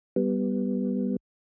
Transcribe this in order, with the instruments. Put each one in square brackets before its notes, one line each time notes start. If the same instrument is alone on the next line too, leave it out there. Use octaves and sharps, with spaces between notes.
[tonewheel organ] G3 B3